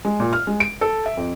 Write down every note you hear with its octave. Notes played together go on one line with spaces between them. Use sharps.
G#3
A#2
F6
G#3
D7
A4
E5
F2